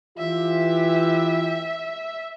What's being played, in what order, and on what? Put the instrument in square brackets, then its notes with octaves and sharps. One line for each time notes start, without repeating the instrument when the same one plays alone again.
[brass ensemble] E3 F4 G4 [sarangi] E5